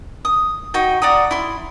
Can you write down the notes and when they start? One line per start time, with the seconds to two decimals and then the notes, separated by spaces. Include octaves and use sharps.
0.25 D#6
0.74 D#4 F#4 G5
1.02 D5 F#5 A#5 D#6
1.31 E4 C6